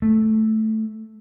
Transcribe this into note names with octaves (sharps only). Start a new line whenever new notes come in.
A3